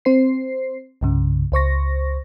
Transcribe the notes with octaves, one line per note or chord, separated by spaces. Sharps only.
C4 C5 C7
C2 G2 C#3
C#2 C5 C#6 A#6